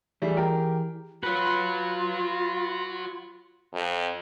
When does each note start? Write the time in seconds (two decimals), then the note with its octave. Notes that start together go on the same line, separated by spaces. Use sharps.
0.22 E3 G3 A3 G#4
0.37 G4 A#4
1.23 F4 F#4 B4 C#5
3.74 F2